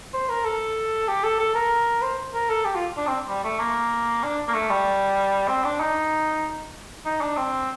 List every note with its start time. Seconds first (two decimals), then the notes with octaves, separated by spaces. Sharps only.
0.13 C5
0.29 A#4
0.45 A4
1.08 G4
1.24 A4
1.39 A4
1.55 A#4
2.02 C5
2.34 A#4
2.49 A4
2.65 G4
2.76 F4
2.97 D4
3.07 C4
3.28 G3
3.44 A3
3.60 A#3
4.23 D4
4.48 A#3
4.54 A3
4.70 G3
5.48 C4
5.64 D4
5.80 D#4
7.06 D#4
7.21 D4
7.37 C4